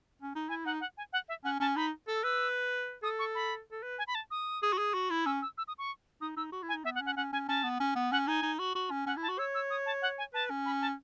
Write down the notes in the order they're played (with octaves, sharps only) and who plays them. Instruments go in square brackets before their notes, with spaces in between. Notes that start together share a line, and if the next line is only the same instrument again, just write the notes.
[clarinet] C#4
D#4
[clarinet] E4 [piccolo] G#5
[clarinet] D#4 [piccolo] F#5
[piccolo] F#5
G#5
F#5
E5
[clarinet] C#4 [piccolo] F#5
[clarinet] C#4 [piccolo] A5
[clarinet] D#4 [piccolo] B5
[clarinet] A4 [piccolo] E6
[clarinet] B4 [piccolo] E6
[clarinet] A4 [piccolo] D#6
[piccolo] C#6
B5
[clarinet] A4
B4
[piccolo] G#5
B5
A5
D#6
[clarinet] G#4
F#4
G#4
F#4
E4
[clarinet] C#4 [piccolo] E6
[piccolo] E6
E6
D#6
C#6
[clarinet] D#4 [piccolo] D#6
[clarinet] D#4 [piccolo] E6
[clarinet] F#4
E4
[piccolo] G#5
[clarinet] D#4
[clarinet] B3 [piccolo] E5
[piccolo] F#5
[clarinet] C#4
[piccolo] F#5
[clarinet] C#4 [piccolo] F#5
[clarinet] C#4 [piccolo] G#5
[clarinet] C#4 [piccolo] A5
[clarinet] B3
C#4
B3
[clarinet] C#4 [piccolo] F#5
[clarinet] D#4 [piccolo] G#5
[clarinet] D#4
F#4
F#4
C#4
[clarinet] C#4 [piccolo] F#5
[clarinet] E4
[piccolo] A5
[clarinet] F#4
[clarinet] C#5 [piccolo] E6
[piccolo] E6
D#6
A5
F#5
G#5
[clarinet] B4 [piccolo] A5
[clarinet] C#4
[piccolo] B5
A5